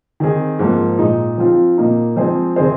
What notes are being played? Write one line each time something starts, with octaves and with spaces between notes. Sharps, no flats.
D#3 C4 G#4
G#2 F3 A#3
A#2 G#3 D#4
F3 C4 F4
A#2 A#3 D#4
F3 G#3 C4 G#4 C5
C3 D#3 C4 G#4 C5